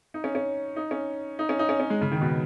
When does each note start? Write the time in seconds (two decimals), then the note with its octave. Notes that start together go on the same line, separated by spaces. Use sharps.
0.14 D#4
0.24 C#4
0.35 C#4
0.76 D#4
0.91 C#4
1.39 D#4
1.49 C#4
1.59 D#4
1.69 C#4
1.80 C#4
1.90 G#3
2.01 C#3
2.12 D#3
2.21 B2